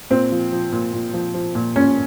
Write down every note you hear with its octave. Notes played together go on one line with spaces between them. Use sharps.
A#2 C4
F3
F3
A#2
A#2
F3
F3
A#2
A#2 C#4